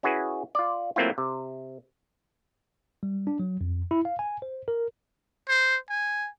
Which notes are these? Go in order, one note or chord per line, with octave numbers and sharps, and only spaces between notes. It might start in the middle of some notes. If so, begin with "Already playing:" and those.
C#4 E4 F#4 G#4 B4
F4 D5
F#3 A3 A#3 C4 E4 F4
C3
G3
D4
F#3
F2
E4
F5
G#5
C5
A#4
C5
G#5